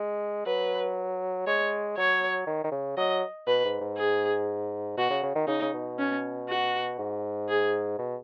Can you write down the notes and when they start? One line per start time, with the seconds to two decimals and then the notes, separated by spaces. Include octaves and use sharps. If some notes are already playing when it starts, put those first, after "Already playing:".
Already playing: G#3
0.46 F#3 B4
1.47 G#3 C#5
1.97 F#3 C#5
2.47 D#3
2.64 D#3
2.72 C#3
2.97 F#3 D#5
3.47 B2 B4
3.65 G#2
3.81 G#2
3.98 G#4
4.97 B2 F#4
5.10 C#3
5.23 C#3
5.35 D#3
5.47 C#3 D#4
5.62 C#3
5.74 B2
5.99 C#4
6.49 F#4
6.98 G#2
7.49 G#4
7.99 B2